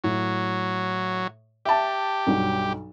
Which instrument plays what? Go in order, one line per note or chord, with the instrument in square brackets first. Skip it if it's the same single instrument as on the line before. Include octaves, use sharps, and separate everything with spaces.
[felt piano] A2 [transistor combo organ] F#3
[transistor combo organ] G4 [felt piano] E5 A5
[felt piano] B1 G2 F#3